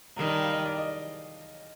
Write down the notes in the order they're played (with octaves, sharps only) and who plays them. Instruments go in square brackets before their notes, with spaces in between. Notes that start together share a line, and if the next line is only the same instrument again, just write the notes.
[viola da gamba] D#3 G3 [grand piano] A#5
[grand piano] A5
F5
D#5
D5
D#5